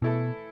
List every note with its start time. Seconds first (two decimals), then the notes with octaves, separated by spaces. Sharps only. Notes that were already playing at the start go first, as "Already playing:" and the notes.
0.02 B2 E3 A3 E4 A4